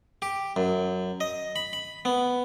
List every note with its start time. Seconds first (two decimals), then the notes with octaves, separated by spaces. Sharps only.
0.22 G4
0.56 F#2
1.20 D#5
1.56 B5
1.73 B5
2.05 B3